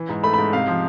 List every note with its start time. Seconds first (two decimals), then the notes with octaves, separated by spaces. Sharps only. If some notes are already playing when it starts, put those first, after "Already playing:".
Already playing: E3
0.09 G#2
0.23 A3 B5
0.34 B5
0.38 G#2
0.53 C3 F5
0.67 F3